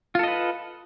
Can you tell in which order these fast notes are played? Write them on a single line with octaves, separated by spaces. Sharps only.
F4 A4 D#5 B4